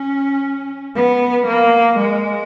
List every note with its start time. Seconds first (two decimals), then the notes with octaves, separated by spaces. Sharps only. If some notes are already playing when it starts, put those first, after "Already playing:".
Already playing: C#4
0.96 B3
1.47 A#3
1.99 G#3